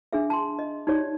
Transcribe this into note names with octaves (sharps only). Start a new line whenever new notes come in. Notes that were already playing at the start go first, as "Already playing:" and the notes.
D4 G#4 E5
A5 C6
D#5
D#4 F#4 G4 C#5 D5